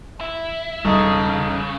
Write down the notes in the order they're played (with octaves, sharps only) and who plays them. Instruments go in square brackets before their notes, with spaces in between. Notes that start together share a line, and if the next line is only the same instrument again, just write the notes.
[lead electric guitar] E4
[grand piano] E1 D#4 A4 [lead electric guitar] C#3 [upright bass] G3